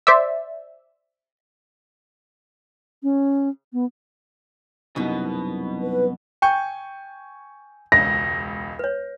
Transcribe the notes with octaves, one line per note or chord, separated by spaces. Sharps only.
C5 D5 E5
C#4
B3
C2 F#2 B2 B3 D#4 E4
B4
G5 G#5 C#6 G6
E1 C#2 A#6
B4 C#5